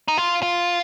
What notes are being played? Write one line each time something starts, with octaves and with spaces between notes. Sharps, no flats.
D#4
F4
F4